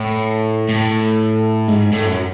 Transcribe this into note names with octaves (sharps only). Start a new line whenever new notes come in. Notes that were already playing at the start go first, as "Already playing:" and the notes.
Already playing: A2
A2
G#2
A2
F#2